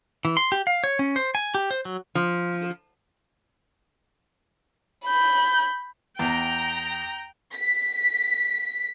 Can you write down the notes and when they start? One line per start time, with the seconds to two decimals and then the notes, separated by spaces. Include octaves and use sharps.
0.25 E3
0.37 C6
0.52 G4
0.67 F5
0.84 C#5
0.99 C#4
1.16 C5
1.35 G#5
1.55 G4
1.71 C5
1.85 F#3
2.15 F3
5.06 B5 G6
6.19 E2 G5 A#5
7.54 B6